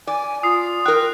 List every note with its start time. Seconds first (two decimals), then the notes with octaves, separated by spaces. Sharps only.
0.07 D5 G#5
0.43 F4 D#6 C7
0.86 A#4 G5 F#6